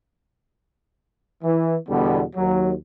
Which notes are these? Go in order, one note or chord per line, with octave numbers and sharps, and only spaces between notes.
E3
E2 B2 D3 G3 B3
D#2 F#3